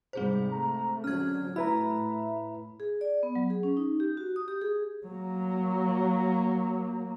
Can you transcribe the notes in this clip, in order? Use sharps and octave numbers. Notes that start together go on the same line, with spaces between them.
G#2 C3 G3 C4 G#4 C5
A3 A#5
D3 F#3 C#4 F6 G#6
A2 E4 B4 E5 A#5 B5
G#4
D5
B3
F#3
G#4
C#4
D#4
G4
F#4
D#6
G4
G#4
F#3 A#3